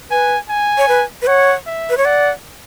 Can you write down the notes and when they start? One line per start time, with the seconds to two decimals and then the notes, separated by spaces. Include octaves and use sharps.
0.10 B4 G#5
0.49 G#5
0.78 C#5
0.88 B4
1.22 B4
1.27 C#5 F#5
1.66 E5
1.90 B4
1.97 C#5
2.05 D5 F#5